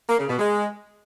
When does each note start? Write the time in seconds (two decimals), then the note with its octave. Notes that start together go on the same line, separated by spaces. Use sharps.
0.09 A#3
0.19 C#3
0.29 B2
0.39 G#3